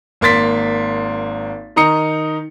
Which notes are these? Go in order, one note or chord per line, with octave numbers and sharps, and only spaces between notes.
G#1 A#3 C6 A6 B6
D#3 D#4 A#5 D#6 C#7